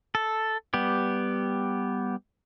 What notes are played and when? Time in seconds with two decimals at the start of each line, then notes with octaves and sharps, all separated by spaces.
0.15 A4
0.74 G3 B3 G4